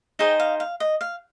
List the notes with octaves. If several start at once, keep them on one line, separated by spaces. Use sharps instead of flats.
D#4 G#4 C5 D#5 G5
F5
F5
D#5
F5